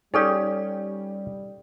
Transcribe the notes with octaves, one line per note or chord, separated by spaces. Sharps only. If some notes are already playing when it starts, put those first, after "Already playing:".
G3 C#4 D#4 G4 A4 C#5 D5